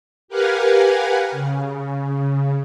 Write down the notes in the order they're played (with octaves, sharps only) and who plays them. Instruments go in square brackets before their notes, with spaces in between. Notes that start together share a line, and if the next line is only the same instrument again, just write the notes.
[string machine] G4 A#4 B4 F5 F#5 G#5
C#3